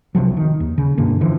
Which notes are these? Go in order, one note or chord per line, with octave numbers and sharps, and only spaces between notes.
B1 C3 F3 F#3
D#3
D#2
C#3
G2 B2 D3 A#3
D3 E3 F3